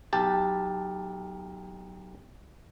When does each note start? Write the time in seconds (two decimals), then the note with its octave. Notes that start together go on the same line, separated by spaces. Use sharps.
0.13 B1 G4 A5